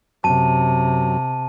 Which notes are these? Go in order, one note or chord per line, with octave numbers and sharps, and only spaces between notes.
F#2 C3 A5 D#7